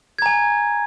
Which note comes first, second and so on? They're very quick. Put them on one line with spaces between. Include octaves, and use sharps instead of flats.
G#6 A#5 G#5